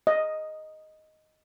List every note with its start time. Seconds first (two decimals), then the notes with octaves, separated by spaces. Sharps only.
0.07 D#5